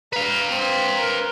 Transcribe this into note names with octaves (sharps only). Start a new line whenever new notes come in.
B4 F5 A#5
C4
A#4